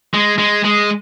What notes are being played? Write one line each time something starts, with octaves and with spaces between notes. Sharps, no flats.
G#3
G#3
G#3